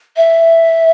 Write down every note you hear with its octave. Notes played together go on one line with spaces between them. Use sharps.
E5